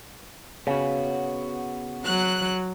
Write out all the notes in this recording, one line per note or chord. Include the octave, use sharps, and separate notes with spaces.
C#3 B3 F#4
F#3 F#6